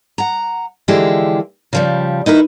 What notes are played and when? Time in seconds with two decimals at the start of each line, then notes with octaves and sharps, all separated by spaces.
0.18 F#5 A#5
0.88 D3 E3 F3 G#3 E4 G4
1.73 C#3 F3 G3
2.26 D#4 E4 A#4 B4